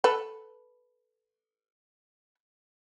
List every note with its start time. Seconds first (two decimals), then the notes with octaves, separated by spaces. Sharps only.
0.04 A4 B4